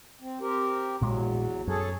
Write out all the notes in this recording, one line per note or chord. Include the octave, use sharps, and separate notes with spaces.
C4
C4 G4 A#4
A#1 E2 A#2 F#3 G#3
F#2 G#4 A4 C#5